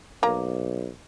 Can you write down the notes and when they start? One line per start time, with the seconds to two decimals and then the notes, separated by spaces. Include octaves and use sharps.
0.23 B1 A#3 A#5